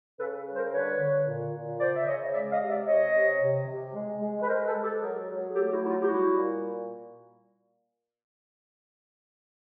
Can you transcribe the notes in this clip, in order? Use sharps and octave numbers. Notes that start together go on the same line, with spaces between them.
C#3 A4 B4
G3
A#4 C5
D3 B4 C#5
D3
A#2
A#2
C#3 C5 D5
E5
C#3 C#5 D#5
G#3 D5 E5
D#5 F5
C3
D5 E5
C3 C#5 D#5
C3
C3
C3
G#3
G#3
B4
G#3 A#4 C5
A4 B4
G#3
G4 A4
F#3 G#4 A#4
F#3
G#4
A3 G4 A4
E4 F#4
F#3
E4
D#4 F4
G4
G3 E4 F#4
A#2